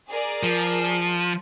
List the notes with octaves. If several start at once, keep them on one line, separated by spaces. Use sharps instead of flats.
G#4 A#4 D5
F3